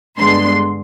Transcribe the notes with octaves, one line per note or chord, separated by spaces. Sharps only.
G2 D3 G#3 B3 C6